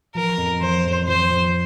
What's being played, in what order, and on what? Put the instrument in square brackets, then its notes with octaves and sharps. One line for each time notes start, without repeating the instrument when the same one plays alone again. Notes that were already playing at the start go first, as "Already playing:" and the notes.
[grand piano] F3 [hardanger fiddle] A#4
[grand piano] F2
[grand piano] F3 [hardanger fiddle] C5
[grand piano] F2
[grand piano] F3 [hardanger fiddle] C5
[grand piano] F2